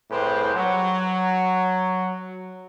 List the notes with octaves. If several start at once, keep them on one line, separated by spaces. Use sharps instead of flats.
C2 A2 G4 G#4 B4 C5
F#3